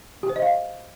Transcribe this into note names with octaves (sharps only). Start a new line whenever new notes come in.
G4
C5
D#5
F5